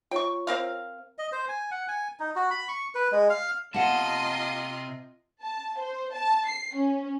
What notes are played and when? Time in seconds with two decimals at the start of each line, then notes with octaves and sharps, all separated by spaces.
0.11 F4 C#5 G5 C#6
0.47 C4 A#4 F5
1.18 D#5
1.32 C5
1.49 G#5
1.71 F#5
1.88 G#5
2.20 D#4
2.36 F#4
2.50 B5
2.68 C#6
2.95 B4
3.12 G#3
3.30 F5
3.74 C3 A#3 F4 D#5 F#5 A5 C6
5.42 A5
5.78 C5
6.14 A5
6.47 C7
6.75 C#4